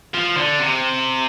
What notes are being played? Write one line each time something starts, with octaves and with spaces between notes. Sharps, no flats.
F3
D3
C3